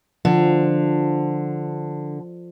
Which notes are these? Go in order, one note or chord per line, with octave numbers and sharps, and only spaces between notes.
D3 F3